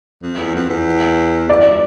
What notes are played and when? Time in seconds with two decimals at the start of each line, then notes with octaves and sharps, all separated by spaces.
0.22 F2
0.38 E2
0.55 F2
0.70 E2
1.48 E2 D5